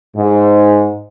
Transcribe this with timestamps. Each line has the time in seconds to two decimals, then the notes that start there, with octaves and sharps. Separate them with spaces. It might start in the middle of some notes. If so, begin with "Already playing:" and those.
0.17 G#2